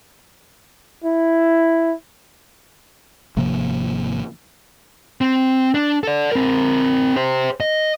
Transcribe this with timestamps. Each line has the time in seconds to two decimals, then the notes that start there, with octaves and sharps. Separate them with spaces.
1.04 E4
3.36 G#1 C3 F3 A#3
5.21 C4
5.74 D4
6.04 A4 D5
6.32 C4 A#4
7.16 G4 C5
7.60 D#5